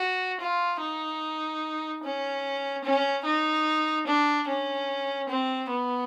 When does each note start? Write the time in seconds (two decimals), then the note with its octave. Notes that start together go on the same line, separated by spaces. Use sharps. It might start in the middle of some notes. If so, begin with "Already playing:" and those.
Already playing: F#4
0.41 F4
0.81 D#4
2.03 C#4
2.84 C#4
3.25 D#4
4.07 D4
4.48 C#4
5.29 C4
5.70 B3